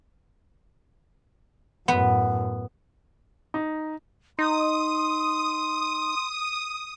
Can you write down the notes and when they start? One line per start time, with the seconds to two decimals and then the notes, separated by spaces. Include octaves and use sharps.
1.88 F#2 A2 B3
3.54 D#4
4.39 D#4 C6 D#6